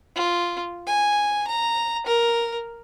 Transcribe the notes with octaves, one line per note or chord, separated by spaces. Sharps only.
F4
G#5
A#5
A#4